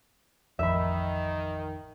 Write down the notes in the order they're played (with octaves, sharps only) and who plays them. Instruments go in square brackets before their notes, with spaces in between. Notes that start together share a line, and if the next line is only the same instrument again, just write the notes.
[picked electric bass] A1 F2 [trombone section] D#3 [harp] E5 B5